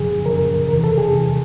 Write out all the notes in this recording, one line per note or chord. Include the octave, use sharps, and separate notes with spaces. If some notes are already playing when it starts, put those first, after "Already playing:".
Already playing: F#2 C#3 F3 G#4
F#2 C#3 F3 A#4
E2 C3 E3 A#4
A4
G#4
E2 C3 E3